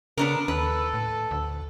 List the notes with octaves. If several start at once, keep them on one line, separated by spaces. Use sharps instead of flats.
C#3 B3 D4 A#4
D#2 A4 B4
A2
D2